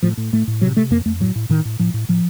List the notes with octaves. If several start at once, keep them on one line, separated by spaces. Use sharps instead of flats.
A2 F3
A2
A2 A3
A2
C3 F#3
C3 A3
F2 A#3
F2 A3
A2 F#3
A2
A2 D#3
A2
A2 F3
A2
A2 F3